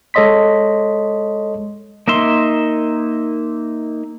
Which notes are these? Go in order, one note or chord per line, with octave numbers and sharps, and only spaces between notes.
G#3 A4 C#5 D#5 C6 B6
A#3 D#4 E5 C6